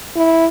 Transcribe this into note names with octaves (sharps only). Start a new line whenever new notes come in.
E4